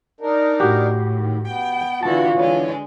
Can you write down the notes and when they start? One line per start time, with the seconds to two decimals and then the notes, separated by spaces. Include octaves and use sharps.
0.21 D4 D#4 A#4
0.60 A2 F#4 G4
1.12 D#3
1.46 B3 G5
2.03 D3 E3 F4 F#4 A5
2.37 D3 E3 G#3 C#5